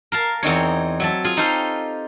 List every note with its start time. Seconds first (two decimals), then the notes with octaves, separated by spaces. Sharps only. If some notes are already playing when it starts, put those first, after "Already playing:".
0.12 A#4 F5 A5
0.43 E2 C4 D#4 C#5
1.00 F#3 E5 A5
1.25 F4 G#4
1.37 D#4 G4 A4 C5 F5